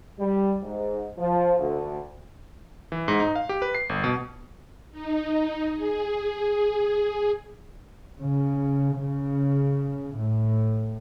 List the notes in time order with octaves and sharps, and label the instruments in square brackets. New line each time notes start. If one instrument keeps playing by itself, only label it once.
[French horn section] G3
G#2
F3
D2
[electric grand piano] E3
G#2
D#4
F5
G4
B4
C7
G1
B2
[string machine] D#4
G#4
[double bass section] C#3
C#3
A2